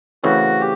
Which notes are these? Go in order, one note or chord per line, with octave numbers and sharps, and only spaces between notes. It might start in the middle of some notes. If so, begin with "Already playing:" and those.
C#3 E3 A3 C4 E4 F#4
G4